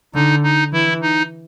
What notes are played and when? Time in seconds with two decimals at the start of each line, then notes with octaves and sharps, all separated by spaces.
0.14 D3 D#4
0.43 D#4
0.73 E3 E4
1.02 D#4